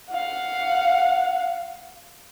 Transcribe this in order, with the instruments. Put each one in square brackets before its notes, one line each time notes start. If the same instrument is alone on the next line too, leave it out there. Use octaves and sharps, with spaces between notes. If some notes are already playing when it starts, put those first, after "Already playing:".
[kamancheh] F5 F#5